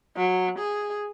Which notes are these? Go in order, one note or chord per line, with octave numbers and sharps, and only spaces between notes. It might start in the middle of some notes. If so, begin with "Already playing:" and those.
F#3
G#4